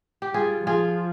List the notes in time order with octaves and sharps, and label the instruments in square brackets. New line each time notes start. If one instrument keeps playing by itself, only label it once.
[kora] G4
[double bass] G3 [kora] F4 G#4
[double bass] F3 [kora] F4 G#4